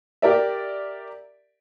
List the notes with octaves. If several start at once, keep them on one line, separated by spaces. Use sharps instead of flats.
G4 A#4 D5 E5